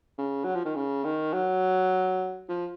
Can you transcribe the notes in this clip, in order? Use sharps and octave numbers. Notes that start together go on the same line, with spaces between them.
C#3
F#3
F3
D#3
C#3
D#3
F#3
F3